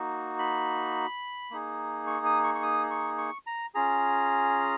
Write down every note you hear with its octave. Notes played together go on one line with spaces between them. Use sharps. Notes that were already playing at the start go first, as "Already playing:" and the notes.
Already playing: A#3 D#4 F#4
B5
A#3 D#4 G#4
C#6
D#6
C#6
C#6
D#6
C#6
C#6
A#5
C#4 F4 G#4 A#5